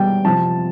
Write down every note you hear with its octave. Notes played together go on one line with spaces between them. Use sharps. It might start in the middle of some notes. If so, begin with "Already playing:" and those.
Already playing: B2 G3 G5
C3 F3 C4 A5